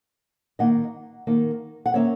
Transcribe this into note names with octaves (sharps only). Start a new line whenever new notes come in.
D#3 A#3 D#4 D#5 F#5
D#3 A#3 D#4
F#5
D#3 A#3 C#4 C#5 E5